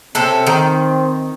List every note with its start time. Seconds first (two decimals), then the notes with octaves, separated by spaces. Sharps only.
0.15 C3 C4 C#4 A4
0.47 D#3